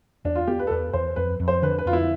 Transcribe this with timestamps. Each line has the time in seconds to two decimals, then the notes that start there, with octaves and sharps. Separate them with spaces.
0.25 E2 D4
0.36 F4
0.47 B3 G4
0.59 B4
0.67 A4
0.70 E2 B4
0.93 E2 C5
1.16 F2 B4
1.40 F2
1.48 C5
1.62 D3 B4
1.79 B4
1.86 F2 F4
1.93 E4